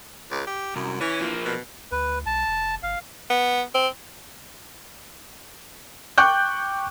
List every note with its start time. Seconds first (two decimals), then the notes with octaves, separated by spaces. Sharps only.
0.32 C#2
0.47 G4
0.76 C2 F#2
1.01 E3 C#4
1.22 F3 A#3
1.45 B2
1.92 D2 B4
2.26 B1 A5
2.48 F1
2.83 G1 F5
3.30 B3
3.75 C4
6.18 G5 C#6 D6 F#6 G6